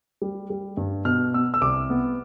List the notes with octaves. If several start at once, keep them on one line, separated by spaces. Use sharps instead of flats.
G3
G3
G2
B2 F6
B3 E6
E6
C2 D6
B3